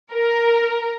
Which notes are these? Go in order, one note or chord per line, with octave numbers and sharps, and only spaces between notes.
A#4